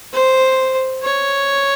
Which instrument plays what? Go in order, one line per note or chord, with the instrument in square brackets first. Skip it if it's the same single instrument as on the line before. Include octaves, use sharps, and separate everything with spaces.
[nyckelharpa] C5
C#5